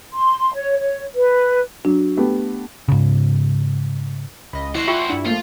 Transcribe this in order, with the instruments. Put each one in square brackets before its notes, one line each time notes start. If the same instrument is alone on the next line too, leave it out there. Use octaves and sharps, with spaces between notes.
[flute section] C6
C#5
C#5
B4
[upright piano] F#3 [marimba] D4
[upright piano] A3 B3 G4
[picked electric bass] G#2 C#3
[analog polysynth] C#2 D#5 [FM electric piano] B5
[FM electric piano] E4 [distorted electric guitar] F#4 C5 [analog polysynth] F#6 C#7
[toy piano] F4 G5 C#6 [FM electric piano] E5
[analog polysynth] G2 E4 [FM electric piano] D4 E6
[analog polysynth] F3 [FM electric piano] A3 A#3 [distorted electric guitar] F4